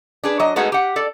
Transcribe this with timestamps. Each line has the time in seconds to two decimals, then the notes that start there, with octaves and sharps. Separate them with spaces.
0.24 D4 G#4 B4
0.40 F#3 D#5
0.56 G#3 A3 B3 D#4 F#4 G#4
0.72 G4 F#5
0.96 A4 D5